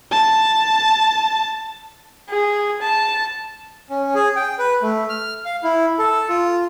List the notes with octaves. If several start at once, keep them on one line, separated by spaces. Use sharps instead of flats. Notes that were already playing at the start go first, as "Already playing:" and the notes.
A5
G#4
A5
C#4
G#4
G5
B4
A3
F6
F5
E4
A4
F4